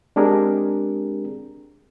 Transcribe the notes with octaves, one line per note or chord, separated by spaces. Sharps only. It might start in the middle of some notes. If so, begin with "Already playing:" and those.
G#3 C4 D4 G4 G#4 A#4